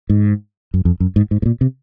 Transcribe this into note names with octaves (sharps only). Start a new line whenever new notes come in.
G#2
F#2
F2
F#2
G#2
G#2
G#2
A#2
C3